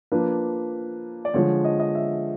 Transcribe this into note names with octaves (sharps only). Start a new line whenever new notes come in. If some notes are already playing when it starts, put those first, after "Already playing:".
F3 A#3 D4 B4
D5
D3 F3 G#3 C#5
D#5
D#5
E5